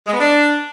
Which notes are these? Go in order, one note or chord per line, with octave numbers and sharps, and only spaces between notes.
G#3
B3
D4